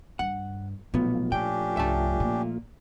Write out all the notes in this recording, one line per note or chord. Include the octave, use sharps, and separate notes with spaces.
G2 F#5
B1 A#2 F3 A3 B3 F4
A#2 C#4 D4 G4 G5
C2 G2 E5 A5
A#2